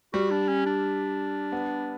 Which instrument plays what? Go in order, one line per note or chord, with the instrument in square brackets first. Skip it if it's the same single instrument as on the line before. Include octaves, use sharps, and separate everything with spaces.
[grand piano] G3 [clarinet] F#4
[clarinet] D4
C#4
D4
[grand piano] B3